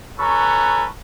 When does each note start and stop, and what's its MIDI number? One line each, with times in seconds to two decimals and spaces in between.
0.20 0.85 61
0.20 0.85 66
0.20 0.85 69
0.20 0.85 71
0.20 0.85 82
0.20 0.85 85